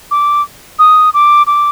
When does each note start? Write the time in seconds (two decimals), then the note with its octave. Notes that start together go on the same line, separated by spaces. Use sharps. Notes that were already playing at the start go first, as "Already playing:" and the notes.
0.11 D6
0.79 D#6
1.14 D6
1.47 D6